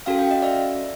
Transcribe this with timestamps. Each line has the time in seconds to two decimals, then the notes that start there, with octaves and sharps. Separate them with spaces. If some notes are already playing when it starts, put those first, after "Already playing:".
0.06 C#4 F#4 A4 F5 G5
0.19 F5 G5
0.31 D#5 F5
0.42 D5 E5